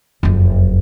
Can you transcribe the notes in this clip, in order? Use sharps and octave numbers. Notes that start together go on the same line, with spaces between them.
F#1 F2